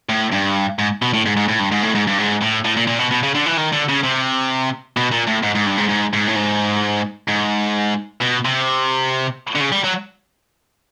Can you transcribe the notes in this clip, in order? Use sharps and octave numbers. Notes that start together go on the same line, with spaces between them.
A2
G2
G#2
B2
A2
G#2
G#2
A2
G2
G#2
A2
G#2
G2
G#2
A2
A2
A#2
A#2
B2
B2
C#3
D3
E3
D#3
D3
C#3
C3
B2
A#2
A2
G#2
G#2
G2
G#2
G#2
G#2
A2
G#2
G#2
B2
C3
D3
C#3
G3
F#3